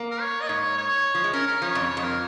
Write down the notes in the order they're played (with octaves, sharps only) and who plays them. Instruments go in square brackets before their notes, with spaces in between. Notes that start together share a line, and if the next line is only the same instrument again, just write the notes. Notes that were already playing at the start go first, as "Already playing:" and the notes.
Already playing: [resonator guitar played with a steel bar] A#3
[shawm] A#4
C#5
D#5
[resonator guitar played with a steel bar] G#2 [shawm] C#5
[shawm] C#5
[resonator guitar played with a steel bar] F3
G#3
[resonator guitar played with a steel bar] C#4 [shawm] A#4
[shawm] A#4
[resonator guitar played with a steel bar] F3 [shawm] C#5
[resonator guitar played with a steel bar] F2
[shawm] C#5
[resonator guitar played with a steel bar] F2
[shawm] A#4